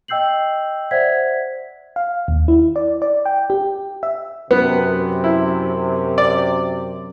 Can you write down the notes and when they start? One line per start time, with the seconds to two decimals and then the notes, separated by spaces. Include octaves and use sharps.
0.08 D#5 G5 E6 G6 C7 F#7
0.91 C5 D5 E5 F#5 G#6 B6
1.96 F5
2.28 D#2
2.48 E4
2.76 D5
3.02 D5
3.26 G5
3.50 G4
4.03 E5
4.51 F#2 C3 B3
5.24 E4
6.18 D5